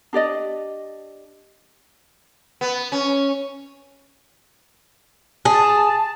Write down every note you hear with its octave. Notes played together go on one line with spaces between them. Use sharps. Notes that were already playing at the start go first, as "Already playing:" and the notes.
D4 G4 D5 D#5
B3
C#4
G#4 A5